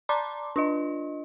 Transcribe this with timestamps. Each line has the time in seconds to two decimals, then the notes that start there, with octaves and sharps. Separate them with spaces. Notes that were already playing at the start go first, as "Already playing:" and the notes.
0.09 D5 A5 A#5 C6 D6
0.56 D4 F4 D#5